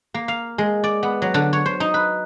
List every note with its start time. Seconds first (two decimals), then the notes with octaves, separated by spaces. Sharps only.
0.14 A#3
0.28 F5
0.58 G#3
0.84 D5
1.03 B3
1.22 F#3
1.34 D3
1.53 C#5
1.66 C5
1.80 D#4
1.94 B4